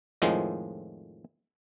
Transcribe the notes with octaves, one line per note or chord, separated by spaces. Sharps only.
F2 A2 D#3 F3 G#3